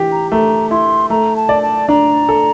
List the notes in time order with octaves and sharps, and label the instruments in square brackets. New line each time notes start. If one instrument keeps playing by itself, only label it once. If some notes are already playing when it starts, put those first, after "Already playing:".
Already playing: [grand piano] E3 G4
[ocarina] A#5
[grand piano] A3 [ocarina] A#5
[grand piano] E4 [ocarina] C6
[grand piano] A3 [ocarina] A#5
[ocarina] A5
[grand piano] D5
[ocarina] A5
[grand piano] D4 [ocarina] A#5
[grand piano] A4